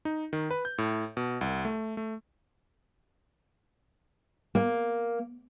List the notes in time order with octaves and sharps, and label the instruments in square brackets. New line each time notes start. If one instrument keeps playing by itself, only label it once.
[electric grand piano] D#4
D#3
B4
G6
A2
B2
C2
A3
A3
[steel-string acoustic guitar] A#3